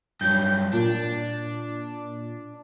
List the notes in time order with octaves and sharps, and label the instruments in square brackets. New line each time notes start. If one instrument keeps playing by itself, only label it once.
[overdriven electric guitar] G2 F#3 [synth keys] G6
[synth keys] A#2 [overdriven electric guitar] D4